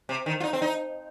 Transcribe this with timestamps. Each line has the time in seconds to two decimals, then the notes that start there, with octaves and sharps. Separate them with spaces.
0.09 C3
0.26 D#3
0.40 F4
0.44 D#4
0.53 C4
0.62 D#4